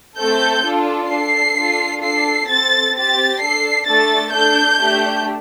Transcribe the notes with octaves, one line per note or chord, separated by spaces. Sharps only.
A3 C4 A4 G6
D4 F4 A4
D4 A4 C7
D4 F4 A4
D4 A4 C7
C4 A4 A6
C4 G4 A6
D4 A4 C7
A3 D4 A4 A6
D4 A4 G6
A3 D4 G4